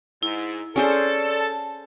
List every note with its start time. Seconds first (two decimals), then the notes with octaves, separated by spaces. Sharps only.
0.23 G#2 E4
0.76 C#4 G#4 A4 C5 D5
1.40 A5